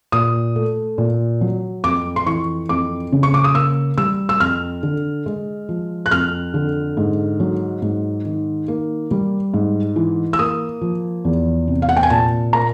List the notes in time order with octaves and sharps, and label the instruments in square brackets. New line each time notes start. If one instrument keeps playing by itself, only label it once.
[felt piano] A#2 D#6
A3
A#2
F#3
F2 D6
C6
E3 C#6
F2 D6
C#3
C#6
D6
D#6
A#3 E6
G3 E6
E6
F2 F6
D3
G#3
F3
F#6
F2 F6
D3
G#2
F#3
G#2
D#3
A#3
G3
G#2
E3
E6
A#3 D#6
F3
E2
C3
F5
F#5
G5
G#5
A#2 A5
A#3 A#5